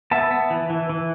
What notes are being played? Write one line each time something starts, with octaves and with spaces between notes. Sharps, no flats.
B3 E5 A5
B3
E3
E3
E3